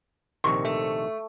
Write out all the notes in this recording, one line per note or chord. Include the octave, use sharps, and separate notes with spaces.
A#1 C3 D#3 C#6
A3